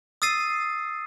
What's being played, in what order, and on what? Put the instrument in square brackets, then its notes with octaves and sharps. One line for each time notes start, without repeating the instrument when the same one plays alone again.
[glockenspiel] D#6 E6 A6 C7 D#7